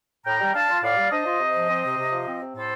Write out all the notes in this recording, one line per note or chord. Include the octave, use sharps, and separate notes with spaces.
A2 G5 A#5
G3
D4 F5 A5
F4
A2 D5 F5
G3
D4 C5 D#5
F4
C3
F3
C4
C3
C3
F3
C4
C3
A2 A4 C5